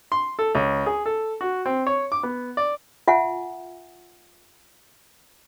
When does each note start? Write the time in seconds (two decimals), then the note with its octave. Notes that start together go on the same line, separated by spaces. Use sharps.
0.12 C6
0.39 A4
0.55 C#2
0.86 G#4
1.06 A4
1.41 F#4
1.66 C4
1.87 C#5
2.12 D6
2.23 B3
2.57 D5
3.08 F4 E5 F#5 G#5